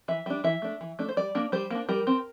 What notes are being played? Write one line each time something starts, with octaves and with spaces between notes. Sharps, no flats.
E3 E5
G3 D4
E3 E5
A3 D4
E3
A3 D4
C5
G3 D5
A#3 D4
G3 C5
A#3 D4
G3 A#4
C4